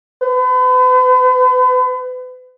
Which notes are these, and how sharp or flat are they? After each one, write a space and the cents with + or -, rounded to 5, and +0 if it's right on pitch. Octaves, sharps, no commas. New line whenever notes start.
B4 +40